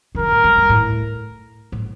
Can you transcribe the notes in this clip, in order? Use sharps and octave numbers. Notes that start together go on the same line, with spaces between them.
D#3
D3 A#4
A2
G2
G2
A2
A2